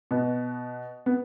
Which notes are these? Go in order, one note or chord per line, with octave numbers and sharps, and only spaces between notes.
B2 B3
B3